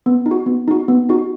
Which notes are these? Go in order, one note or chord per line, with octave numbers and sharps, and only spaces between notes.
B3
D#4
F#4
B3
D#4 F#4
B3
D#4 F#4